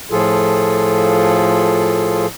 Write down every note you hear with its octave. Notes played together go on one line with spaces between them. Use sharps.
A2 F3 F4 G#4 A4